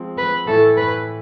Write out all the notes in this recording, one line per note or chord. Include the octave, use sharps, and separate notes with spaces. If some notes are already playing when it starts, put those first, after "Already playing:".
Already playing: F3 G#3 C4
B4
A2 E3 A3 E4 A4
B4